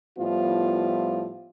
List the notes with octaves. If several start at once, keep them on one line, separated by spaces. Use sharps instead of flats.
A2 F3 G3 B3 E4 F4